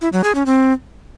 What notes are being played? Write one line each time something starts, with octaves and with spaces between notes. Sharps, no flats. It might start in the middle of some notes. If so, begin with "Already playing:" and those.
E4
F#3
G#4
C#4
C4